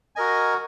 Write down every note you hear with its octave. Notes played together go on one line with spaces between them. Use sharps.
F#4 A#4 D#5 G#5